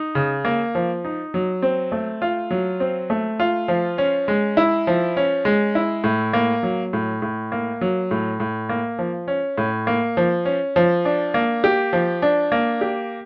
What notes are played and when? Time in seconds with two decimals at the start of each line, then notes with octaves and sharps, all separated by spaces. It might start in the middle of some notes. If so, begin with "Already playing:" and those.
Already playing: D#4
0.15 C#3
0.45 A#3
0.75 F3
1.05 D#4
1.34 F#3
1.62 C4
1.92 A3
2.22 F4
2.51 F#3
2.80 C4
3.10 A3
3.40 F4
3.68 F3
3.98 C#4
4.28 G#3
4.57 E4
4.87 F3
5.17 C#4
5.45 G#3
5.75 E4
6.04 A2
6.33 A#3
6.63 F#3
6.93 A2
7.22 A2
7.52 A#3
7.81 F#3
8.11 A2
8.40 A2
8.69 A#3
8.99 F3
9.28 C#4
9.58 A2
9.87 A#3
10.17 F3
10.45 C#4
10.76 F3
11.05 D4
11.34 A#3
11.64 G4
11.93 F3
12.22 D4
12.52 A#3
12.81 G4